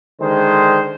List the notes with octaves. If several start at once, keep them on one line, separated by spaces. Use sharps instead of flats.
D3 D#3 G#3 C5